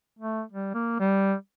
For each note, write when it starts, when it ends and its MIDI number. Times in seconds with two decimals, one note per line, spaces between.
0.19 0.43 57
0.52 0.72 55
0.74 1.00 58
1.00 1.34 55